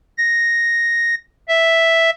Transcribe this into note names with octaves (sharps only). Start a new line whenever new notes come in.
A#6
E5